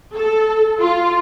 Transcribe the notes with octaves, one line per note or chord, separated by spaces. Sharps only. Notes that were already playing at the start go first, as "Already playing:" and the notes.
A4
F4